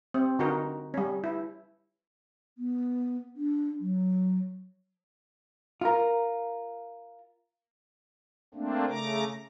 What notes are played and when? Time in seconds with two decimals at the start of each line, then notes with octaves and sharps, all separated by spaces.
0.14 C4
0.39 D3 D#4 F#4 A#4
0.94 G3 C#4
1.24 E4
2.58 B3
3.36 D4
3.80 F#3
5.81 F4 A#4
8.54 A3 A#3 C4 D4
8.89 C#3 A3 A#5 D6